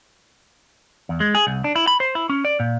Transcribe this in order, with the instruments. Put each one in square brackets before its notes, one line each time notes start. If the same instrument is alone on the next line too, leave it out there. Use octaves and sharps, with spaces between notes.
[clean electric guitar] E2
G#3
G#4
C2
D4
E4
B5
C5
E4
C#4
D5
A#2